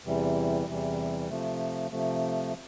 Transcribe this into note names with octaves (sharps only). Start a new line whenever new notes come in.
E2 C3 E3 G3
E2 C3 E3 G3
C3 F3 A3
C3 F3 A3